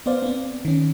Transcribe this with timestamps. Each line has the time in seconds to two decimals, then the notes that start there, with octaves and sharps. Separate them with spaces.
0.06 B3 C5 D5 F5
0.22 B3 C4
0.65 D#3 C#4